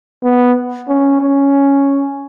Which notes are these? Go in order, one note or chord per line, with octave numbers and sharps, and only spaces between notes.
B3
C#4
C#4